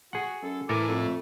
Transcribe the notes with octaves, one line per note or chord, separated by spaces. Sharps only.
F#4 G#4 F#5
F#2 A4
A2 E3 A4 A#4 G#5 D6
F2 A3